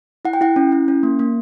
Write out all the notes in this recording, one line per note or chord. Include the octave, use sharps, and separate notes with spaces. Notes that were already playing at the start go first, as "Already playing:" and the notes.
E4 F#5
G5
E4 F#5
C#4
E4
C#4
A#3
A#3